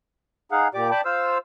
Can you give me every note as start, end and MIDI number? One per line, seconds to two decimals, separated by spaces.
0.52 0.68 63
0.52 0.68 68
0.52 0.68 77
0.52 0.68 78
0.74 0.91 46
0.74 0.91 67
0.74 0.91 74
0.74 0.91 86
0.91 1.01 74
0.91 1.01 79
0.91 1.01 81
0.91 1.01 83
0.91 1.01 86
1.05 1.38 65
1.05 1.38 72
1.05 1.38 77
1.05 1.38 88